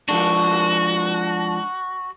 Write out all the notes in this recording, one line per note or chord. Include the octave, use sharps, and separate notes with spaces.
F3 G#3 D4 F#4